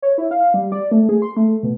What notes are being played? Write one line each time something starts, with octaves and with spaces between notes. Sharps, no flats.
C#5
E4
F5
G3
D5
A3
G#4
C6
A3
B2